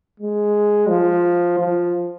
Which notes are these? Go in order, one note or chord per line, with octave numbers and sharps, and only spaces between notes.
G#3
F3
F3